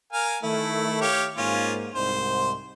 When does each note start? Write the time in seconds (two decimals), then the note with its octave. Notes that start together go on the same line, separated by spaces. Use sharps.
0.13 A#4 F5 G#5
0.42 D#3 A3 E4
1.01 G4 C#5 F5
1.37 G#2 A#3 C#4 F4
1.94 C2 G#2 C5